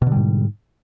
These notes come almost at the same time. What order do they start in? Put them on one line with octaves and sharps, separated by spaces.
B2 D3 G3 G#2